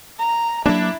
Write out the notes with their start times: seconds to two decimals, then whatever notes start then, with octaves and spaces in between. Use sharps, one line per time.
0.19 A#5
0.66 F#3 A#3 D4 E4